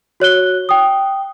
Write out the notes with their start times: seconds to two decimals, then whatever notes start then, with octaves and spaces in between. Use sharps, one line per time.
0.20 F#4 C#5 F#6 G7
0.69 G5 D#6